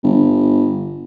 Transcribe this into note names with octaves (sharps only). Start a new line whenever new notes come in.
G1